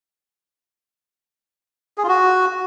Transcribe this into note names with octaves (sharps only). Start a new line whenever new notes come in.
G#4
F4
F#4